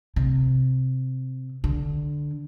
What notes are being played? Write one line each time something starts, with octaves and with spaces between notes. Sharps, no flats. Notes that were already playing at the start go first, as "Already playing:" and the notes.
C3
D3